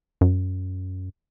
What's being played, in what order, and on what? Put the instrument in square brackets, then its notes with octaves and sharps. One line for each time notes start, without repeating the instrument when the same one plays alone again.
[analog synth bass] F#2